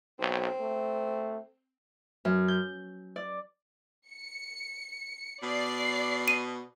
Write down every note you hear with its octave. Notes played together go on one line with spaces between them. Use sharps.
B1 C4
A3
F#2
G6
D5
C#7
B2 D5 C7
D#7